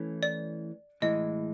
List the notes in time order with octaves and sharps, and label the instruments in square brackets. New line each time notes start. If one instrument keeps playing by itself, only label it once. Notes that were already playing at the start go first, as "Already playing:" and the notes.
Already playing: [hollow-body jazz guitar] E3 A3 C#4
[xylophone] D5
[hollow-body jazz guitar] A2 E3 G#3 [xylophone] D#5